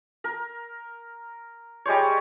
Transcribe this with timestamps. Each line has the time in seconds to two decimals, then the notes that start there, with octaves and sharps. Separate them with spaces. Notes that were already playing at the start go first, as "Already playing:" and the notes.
0.24 A#4
1.85 G3 G#3 C5 C#5